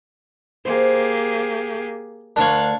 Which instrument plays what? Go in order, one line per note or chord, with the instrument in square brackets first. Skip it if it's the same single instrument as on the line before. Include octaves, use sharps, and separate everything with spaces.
[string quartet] A#3 G4 G#4 [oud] C5
[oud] D2 A#4 [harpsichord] D4 C#5 [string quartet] F5 F#6